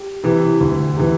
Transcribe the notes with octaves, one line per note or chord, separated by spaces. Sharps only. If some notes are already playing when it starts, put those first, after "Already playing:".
Already playing: G4
C3 E3
D2
C3 E3